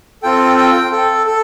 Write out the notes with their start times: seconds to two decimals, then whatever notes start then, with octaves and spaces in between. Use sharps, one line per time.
0.22 C4 F4 A4 G5
0.58 G5
0.92 A4
1.27 A4